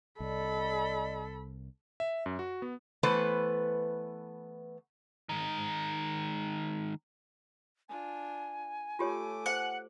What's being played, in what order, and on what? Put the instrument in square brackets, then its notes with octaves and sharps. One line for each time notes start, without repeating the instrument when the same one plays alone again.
[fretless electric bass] C2 [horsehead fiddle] A4 [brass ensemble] D5 D#5 [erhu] B5
[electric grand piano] E5
F#2
F#4
B3
[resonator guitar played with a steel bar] E3 A3 B3 B4 C5
[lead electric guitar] D#3 G#3
[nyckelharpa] D4 F4 [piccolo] G#5
[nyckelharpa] A3 D6 [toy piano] F4 G4 C#5
[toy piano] C5 [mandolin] F#5